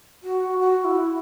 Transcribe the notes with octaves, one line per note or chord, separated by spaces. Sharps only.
F#4
F#4
E4